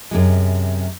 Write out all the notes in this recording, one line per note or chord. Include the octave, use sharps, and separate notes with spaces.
F#2 C3 G#3